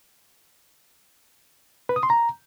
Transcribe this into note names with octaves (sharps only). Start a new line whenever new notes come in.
B4
D#6
C6
A#5